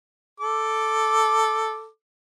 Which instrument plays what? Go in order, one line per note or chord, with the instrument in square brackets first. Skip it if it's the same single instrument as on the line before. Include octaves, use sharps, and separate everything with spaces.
[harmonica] A4 D6